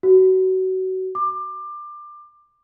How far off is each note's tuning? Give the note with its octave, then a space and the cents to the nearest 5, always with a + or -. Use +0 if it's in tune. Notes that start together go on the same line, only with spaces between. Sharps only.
F#4 +25
D6 +20